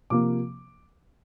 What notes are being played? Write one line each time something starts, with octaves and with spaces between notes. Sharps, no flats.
C3 F3 A#3 D6